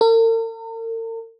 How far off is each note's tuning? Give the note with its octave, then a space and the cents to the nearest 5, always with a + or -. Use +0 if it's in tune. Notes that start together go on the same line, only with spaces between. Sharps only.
A#4 -45